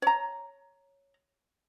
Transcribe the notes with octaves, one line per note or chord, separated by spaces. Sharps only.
C#5 A#5